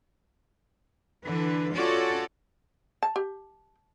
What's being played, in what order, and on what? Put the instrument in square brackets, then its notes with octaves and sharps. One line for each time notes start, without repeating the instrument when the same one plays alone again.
[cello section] D3 E3 B4
C#4 F4 F#4 A4 C#5 D5
[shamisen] A5
G4